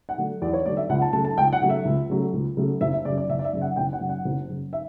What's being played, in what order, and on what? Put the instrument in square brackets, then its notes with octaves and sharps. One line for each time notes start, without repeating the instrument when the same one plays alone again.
[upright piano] F#5
D3 F#3 A3
E2 D5
C#5
D3 F#3 A3 D5
E5
C#2 F#5
A5
C#3 F#3 A3 A5
A5
C#2 G5
F#5
C#3 F#3 A3
E5
C#2
C#3 F#3 A3
C#2
C#3 F#3 A3
F#1 E5
E5
F#2 C#3 D5
D5
F#1 E5
D5
E5
F#2 C#3
F#5
F#1 G5
F#5
F#2 C#3
F#5
F#1
F#2 C#3
E5